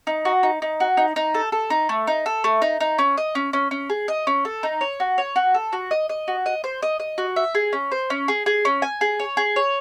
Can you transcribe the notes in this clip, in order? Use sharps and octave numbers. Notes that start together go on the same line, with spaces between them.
D#4
F#4
D#4
D#4
F#4
D#4
D#4
A4
A4
D#4
A3
D#4
A4
A3
D#4
D#4
C#4
D#5
C#4
C#4
C#4
G#4
D#5
C#4
A4
D#4
C#5
F#4
C#5
F#4
A4
F#4
D#5
D#5
F#4
D#5
C5
D#5
D#5
F#4
E5
G#4
C#4
C5
C#4
G#4
G#4
C#4
G#5
G#4
C#5
G#4
C#5